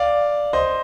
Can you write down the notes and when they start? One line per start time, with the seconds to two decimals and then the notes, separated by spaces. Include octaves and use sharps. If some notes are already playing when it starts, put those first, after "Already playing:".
Already playing: D5 F5
0.53 C5 D#5